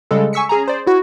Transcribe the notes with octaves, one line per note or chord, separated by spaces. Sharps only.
C#3 G3 G#3 A4
G#5 C#6 E6 B6 C#7
C#4 G#4 G#5 A#5
G#4 C5 D5
E4 F#4